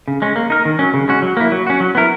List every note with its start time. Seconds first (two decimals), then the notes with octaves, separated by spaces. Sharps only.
0.08 C#3
0.22 G#3 C#4
0.36 A#3
0.50 D#4 A#4
0.65 D#3
0.79 F#3 C#4
0.94 C#3
1.08 G#3 C#4 F#4
1.22 F#3
1.37 A#3 E4
1.52 F#3
1.67 C#4 F#4
1.80 F#3
1.95 B3 E4 A#4